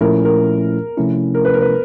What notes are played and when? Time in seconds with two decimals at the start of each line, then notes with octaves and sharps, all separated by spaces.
0.01 A#2 F3 A3 C#4 E4 A#4
0.25 A#4
0.97 C3 F3 A3 C#4 E4
1.34 A#4
1.45 B4
1.54 A#4
1.61 B4